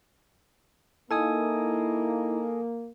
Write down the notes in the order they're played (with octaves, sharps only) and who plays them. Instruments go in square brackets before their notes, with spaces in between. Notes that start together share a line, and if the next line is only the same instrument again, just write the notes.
[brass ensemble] A#3 [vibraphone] D#4 D#5 [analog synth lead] E4 [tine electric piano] A4 G#5 D#6